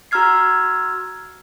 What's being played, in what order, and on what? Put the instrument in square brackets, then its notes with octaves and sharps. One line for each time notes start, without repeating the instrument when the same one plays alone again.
[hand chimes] F#4 A#5 E6 F6 G#6 C7